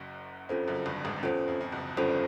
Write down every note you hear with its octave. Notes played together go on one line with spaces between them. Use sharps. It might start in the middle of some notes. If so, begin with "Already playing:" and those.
Already playing: F#1 F#2
F2 C#4 F4 A4 C5
F#1 F#2
G1 G2
G#1 G#2
E2 C#4 F4 A4 C5
F2
F2
F#1 F#2
G1 G2 C#4 F4 A4 C5